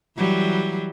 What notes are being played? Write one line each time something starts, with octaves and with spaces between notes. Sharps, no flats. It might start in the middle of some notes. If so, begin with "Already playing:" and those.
E3 F#3 G3